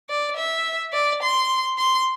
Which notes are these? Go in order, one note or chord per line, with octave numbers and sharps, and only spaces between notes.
D5
E5
D5
C6
C6